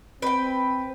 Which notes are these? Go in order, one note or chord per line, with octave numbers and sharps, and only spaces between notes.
C4 B4 G5